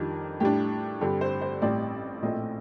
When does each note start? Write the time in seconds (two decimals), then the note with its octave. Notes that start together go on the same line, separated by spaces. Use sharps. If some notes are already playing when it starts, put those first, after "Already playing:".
Already playing: F2 D#3 G3 D4 A#4
0.40 A2 G3 D4 G4
1.01 G2 D3 G3 C4 G4
1.21 C5
1.41 C5
1.62 A1 A2 G3 C4 D5
2.23 A#1 A2 A3 C4 D#5